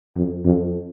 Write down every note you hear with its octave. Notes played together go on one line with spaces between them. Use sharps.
F2
F2